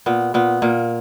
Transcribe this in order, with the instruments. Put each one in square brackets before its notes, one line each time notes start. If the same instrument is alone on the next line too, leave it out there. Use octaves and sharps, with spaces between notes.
[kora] A#2 B3
A#2 B3
A#2 A#3